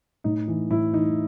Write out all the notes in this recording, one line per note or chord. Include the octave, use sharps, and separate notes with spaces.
A2 D#4
E3
A2 E4
E3 D#4